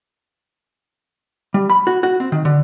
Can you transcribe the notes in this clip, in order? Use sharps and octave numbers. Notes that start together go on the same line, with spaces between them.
G3
B5
F#4
F#4
C4
D#3
D3